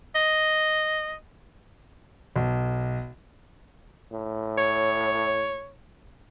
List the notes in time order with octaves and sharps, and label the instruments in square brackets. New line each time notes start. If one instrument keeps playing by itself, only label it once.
[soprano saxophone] D#5
[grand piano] B1
[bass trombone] A2
[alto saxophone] C#5